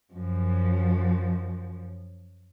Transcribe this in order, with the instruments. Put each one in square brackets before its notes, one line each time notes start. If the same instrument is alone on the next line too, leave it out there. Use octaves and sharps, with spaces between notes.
[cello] F#2 F3